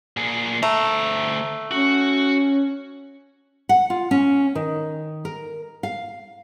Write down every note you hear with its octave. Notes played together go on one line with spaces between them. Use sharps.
A#2 G#4
D2 A3 A#5
C#4 F#4
F#5
F4
C#4
D#3
A#4
F5